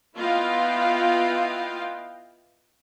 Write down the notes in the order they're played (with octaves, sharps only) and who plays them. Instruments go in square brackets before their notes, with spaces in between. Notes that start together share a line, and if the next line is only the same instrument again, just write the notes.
[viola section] B3 E4 F4 D#5 F5 G5